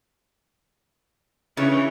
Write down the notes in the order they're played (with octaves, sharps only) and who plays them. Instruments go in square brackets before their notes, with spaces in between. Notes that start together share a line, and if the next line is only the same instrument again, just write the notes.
[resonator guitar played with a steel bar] C#3 [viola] E3 C#5